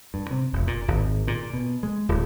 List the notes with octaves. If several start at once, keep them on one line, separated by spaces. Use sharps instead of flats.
G2
C3
F1
A#2
G#1
A#2
B2
G#3
D1